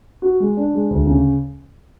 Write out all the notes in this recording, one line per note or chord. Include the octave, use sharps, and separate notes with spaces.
F#4
G#3
D4
G#3
D2
C#3